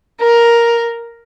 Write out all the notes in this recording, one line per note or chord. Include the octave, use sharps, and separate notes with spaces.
A#4